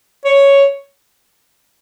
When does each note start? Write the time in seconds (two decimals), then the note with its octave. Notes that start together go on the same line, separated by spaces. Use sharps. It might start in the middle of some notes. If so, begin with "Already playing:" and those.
0.25 C#5